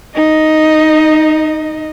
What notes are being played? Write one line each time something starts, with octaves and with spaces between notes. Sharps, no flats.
D#4 D#5